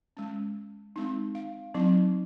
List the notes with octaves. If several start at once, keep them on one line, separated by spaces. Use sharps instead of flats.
G#3 C#4
G#3 C4 D#4
F5
F#3 C4 D#4